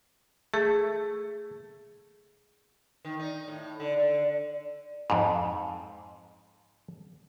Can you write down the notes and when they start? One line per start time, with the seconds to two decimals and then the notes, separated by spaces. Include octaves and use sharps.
0.54 A3 G#4
3.05 D#3
3.20 D#4
3.48 A2
3.80 D3
3.99 D3
5.10 F2 G#2